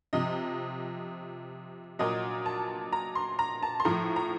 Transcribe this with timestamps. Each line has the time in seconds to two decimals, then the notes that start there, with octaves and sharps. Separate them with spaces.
0.13 C3 F3 D#5
1.99 A#2 F#3 D#5
2.46 A5
2.93 A#5
3.15 C6
3.39 A#5
3.63 A5
3.80 C6
3.85 A2 F3 A#5
4.16 A#5